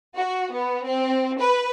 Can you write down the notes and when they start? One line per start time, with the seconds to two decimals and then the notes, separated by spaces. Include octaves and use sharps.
0.15 F#4
0.51 B3
0.84 C4
1.39 B4